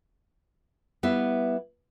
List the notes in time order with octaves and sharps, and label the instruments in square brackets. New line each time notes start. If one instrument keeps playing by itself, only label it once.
[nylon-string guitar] G3 B3 E4 E5